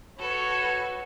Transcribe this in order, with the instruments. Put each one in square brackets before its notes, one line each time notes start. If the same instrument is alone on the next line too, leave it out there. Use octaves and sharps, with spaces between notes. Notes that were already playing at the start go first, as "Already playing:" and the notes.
[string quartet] F#4 A4 B4 [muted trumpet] C#5